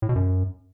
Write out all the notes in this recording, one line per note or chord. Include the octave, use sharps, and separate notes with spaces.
A2
B2
F#2